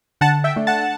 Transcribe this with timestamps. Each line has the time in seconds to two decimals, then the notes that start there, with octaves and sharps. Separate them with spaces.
0.21 D3 F#5 A5
0.44 E5 G5
0.56 A3 D4
0.67 F#5 A5